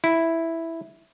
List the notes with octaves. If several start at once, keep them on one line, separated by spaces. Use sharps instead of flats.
E4